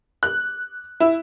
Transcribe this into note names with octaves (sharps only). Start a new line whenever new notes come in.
F#6
E4